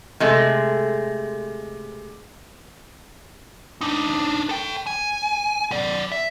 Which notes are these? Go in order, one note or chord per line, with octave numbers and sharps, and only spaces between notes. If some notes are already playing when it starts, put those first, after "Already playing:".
C3 G#3 A3
D4 D#4
A4 G5
G#5
F#3 D5
E5